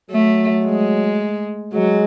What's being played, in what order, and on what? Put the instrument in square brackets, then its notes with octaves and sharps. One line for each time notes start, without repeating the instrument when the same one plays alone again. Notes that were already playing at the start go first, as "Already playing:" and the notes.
[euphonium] F#3 [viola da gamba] A3
[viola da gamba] G#3
[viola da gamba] F#3 [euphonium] G#3